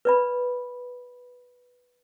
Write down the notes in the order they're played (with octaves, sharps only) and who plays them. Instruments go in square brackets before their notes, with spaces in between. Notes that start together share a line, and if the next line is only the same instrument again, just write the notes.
[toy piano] B4 D5 B5